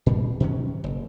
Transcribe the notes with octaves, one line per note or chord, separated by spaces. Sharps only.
A#2 G3
B2 D#3 F#3 C#4
F#1